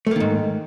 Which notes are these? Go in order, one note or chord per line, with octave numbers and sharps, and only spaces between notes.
G#2 D#3 A3 A#3